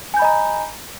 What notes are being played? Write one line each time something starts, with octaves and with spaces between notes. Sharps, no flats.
D#5 G#5 A#5 B5 G6